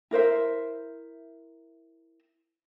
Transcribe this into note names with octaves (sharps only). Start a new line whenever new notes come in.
E4 A#4 C5 E5